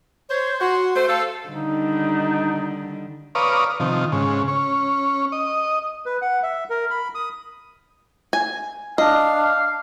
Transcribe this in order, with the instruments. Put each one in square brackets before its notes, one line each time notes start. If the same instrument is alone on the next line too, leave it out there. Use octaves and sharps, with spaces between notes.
[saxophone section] C5 [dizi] C#5
[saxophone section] F#4 [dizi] C6
[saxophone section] A3 C5
[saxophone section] A4 [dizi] F5
[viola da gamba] D3 D#3 G3 [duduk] D#4
[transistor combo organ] B4 C#5 D5 F5 A#5 D#6
C3 D#3 F3
G#2 C#3
C#4
D#5
[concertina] B4
F#5
E5
A#4
B5
D#6
[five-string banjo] G#5
[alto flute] D4 [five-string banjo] D#5 [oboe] F5